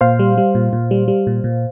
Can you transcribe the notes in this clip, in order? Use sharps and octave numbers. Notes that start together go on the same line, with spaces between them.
A#2 C5 F5
G3
G3
A#2
A#2
G3
G3
A#2
A#2